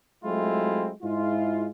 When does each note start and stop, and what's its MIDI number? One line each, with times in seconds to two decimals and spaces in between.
0.24 0.91 54
0.24 0.91 56
0.24 0.91 57
0.24 0.91 60
0.24 0.91 64
0.24 0.91 65
1.03 1.69 44
1.03 1.69 56
1.03 1.69 64
1.03 1.69 65